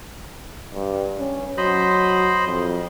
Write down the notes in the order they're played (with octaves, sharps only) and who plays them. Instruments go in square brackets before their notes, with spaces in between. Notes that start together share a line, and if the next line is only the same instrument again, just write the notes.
[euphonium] G2
C#4
[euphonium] F#3 [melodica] C5 D#5 B5
[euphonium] F2